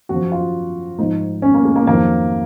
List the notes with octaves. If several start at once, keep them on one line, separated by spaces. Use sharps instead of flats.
F#2 F3 F#4
F4
G#2 F3 D#4
C#4
A#3
G#3
A#3
F2 D#3 F#3 A#3